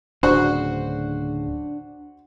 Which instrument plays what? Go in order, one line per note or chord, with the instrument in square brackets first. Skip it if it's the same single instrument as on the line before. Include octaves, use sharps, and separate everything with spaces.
[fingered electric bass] D1 C#3 [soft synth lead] D4 [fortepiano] F#4 C5 F#5